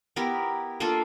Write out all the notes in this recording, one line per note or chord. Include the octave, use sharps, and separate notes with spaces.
B3 E4 G4 A#4
A#3 D4 F4 A4